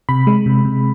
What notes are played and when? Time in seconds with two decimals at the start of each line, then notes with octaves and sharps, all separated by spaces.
0.09 C3 B5
0.27 G#3
0.46 C3
0.65 C3